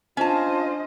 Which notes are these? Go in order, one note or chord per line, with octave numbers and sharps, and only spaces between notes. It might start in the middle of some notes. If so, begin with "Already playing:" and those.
C#4 D4 F4 C5 D#5 G#5 A5